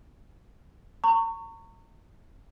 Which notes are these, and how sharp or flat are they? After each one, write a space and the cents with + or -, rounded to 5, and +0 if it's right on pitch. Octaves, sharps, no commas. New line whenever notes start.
A#5 -40 C#6 +0